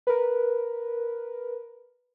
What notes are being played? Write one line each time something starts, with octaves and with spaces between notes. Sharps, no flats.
A#4 B4